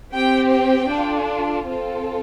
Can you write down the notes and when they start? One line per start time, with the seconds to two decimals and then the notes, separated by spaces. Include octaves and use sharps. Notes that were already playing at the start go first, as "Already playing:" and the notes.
0.13 C4 G4 G5
0.51 G5
0.89 D4 F4 A4
1.66 C4 F4 A4